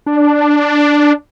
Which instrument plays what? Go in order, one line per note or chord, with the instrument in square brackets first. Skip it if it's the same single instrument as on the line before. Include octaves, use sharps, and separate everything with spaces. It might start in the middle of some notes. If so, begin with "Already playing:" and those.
[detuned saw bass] D4